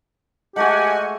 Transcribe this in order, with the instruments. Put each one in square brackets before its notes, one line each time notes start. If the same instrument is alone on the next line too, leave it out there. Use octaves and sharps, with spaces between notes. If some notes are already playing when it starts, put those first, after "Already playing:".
[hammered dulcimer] G#3 A3 F#4 [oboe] G4 [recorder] D#5 [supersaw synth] F#5 G#5